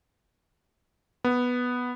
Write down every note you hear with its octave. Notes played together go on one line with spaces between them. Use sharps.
B3